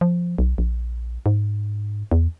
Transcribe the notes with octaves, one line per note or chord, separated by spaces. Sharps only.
F3
B1
A#1
G#2
E2